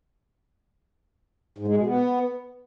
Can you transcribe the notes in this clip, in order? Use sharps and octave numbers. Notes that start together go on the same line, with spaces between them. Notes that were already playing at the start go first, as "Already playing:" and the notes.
G#2
G#3
B2
B3